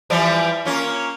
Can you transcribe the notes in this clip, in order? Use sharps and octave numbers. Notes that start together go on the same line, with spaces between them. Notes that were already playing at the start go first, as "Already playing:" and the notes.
E3 F3 G3
A#3 C#4 F4